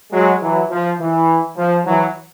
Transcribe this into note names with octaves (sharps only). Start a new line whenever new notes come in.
F#3 G#3
E3 F#3
F3
E3
F3
E3 F#3